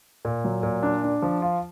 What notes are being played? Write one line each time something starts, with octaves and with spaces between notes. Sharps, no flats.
A#2
F#3
A#2
D4
D4
F3
F4